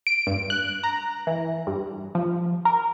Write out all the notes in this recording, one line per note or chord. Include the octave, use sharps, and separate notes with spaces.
D7
G2
F#6
A#5
E3
G2
F3
A#4